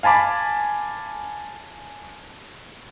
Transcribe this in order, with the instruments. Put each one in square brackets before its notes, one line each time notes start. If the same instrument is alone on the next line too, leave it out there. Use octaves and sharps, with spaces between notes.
[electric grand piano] F5 G#5 A5 B5 D6